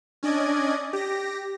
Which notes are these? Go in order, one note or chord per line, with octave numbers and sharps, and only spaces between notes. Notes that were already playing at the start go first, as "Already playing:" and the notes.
C#4 D4 D5 D#5 G#6
G4 A#6